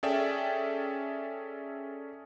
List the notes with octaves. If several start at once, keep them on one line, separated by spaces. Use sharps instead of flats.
C#4 G#4 A4 D5 E5 G5